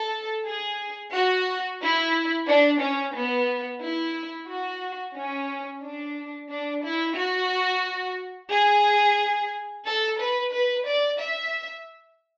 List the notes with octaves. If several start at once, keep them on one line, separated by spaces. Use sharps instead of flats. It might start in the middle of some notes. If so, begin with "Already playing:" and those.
Already playing: A4
G#4
F#4
E4
D4
C#4
B3
E4
F#4
C#4
D4
D4
E4
F#4
G#4
A4
B4
B4
D5
E5